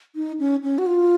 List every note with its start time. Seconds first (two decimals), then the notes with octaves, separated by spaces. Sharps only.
0.16 D#4
0.39 C#4
0.63 C#4
0.78 F#4
0.86 F4